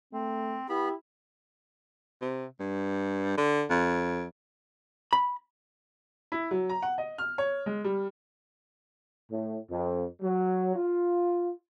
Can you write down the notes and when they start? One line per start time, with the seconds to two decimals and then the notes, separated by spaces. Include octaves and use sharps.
0.13 A3 C4
0.69 B3 E4 G4 B5
2.22 C3
2.60 G2
3.38 D3
3.70 F2
5.13 B5
6.32 E4
6.51 F#3
6.69 A#5
6.82 F#5
6.98 D#5
7.18 F6
7.38 C#5
7.66 G#3
7.84 G3
9.31 A2
9.70 F2
10.22 F#3
10.76 F4